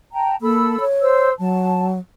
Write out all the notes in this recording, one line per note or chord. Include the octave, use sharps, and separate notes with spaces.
G5 A5 A#5
A#3 A4 B5 E6
C#5
C5 E6
F#3 A5